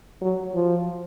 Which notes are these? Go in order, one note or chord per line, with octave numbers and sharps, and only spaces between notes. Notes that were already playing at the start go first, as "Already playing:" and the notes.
F#3
F3